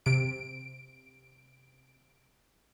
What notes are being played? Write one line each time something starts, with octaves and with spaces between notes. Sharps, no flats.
C3 D7